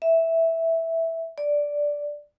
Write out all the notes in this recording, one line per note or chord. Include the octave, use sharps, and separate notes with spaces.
E5
D5